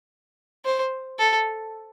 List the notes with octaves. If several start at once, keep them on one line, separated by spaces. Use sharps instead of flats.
C5
A4